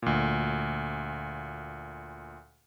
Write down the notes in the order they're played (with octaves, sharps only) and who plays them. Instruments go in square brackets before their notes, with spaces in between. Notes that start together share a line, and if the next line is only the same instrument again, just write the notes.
[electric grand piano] D2 A#2